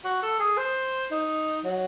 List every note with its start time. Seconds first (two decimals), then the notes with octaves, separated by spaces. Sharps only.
0.05 F#4
0.22 A4
0.40 G#4
0.57 C5
1.11 D#4
1.65 F#3